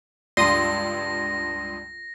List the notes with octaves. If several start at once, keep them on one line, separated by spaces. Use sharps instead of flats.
C#2 G2 D5 C6 D#6 A#6